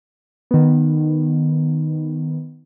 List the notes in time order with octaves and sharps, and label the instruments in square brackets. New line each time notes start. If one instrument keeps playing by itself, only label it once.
[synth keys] D#3 B3